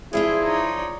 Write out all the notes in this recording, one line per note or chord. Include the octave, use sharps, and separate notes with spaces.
F3 D4 E4 F4 G#4
D#4 C#5 D5